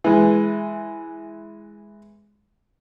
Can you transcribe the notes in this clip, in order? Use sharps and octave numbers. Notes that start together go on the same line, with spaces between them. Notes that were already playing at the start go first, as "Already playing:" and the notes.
E3 G#3